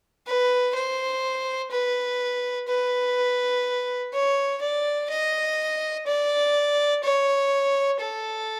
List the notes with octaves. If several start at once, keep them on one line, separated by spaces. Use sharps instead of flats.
B4
C5
B4
B4
C#5
D5
D#5
D5
C#5
A4